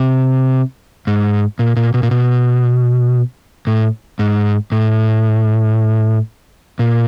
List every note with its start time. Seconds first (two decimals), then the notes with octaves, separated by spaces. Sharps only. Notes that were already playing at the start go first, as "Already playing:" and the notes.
Already playing: C3
1.07 G#2
1.59 A#2
1.76 A#2
1.94 B2
2.03 A#2
2.11 B2
3.67 A2
4.19 G#2
4.72 A2
6.79 A#2